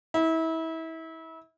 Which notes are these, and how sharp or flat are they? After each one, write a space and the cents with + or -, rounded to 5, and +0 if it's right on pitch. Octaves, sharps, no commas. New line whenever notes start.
E4 -30